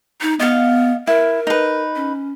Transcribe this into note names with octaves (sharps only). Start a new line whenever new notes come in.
D#4
B3 D#5 F5
E4 A#4
D#4 B4
C#4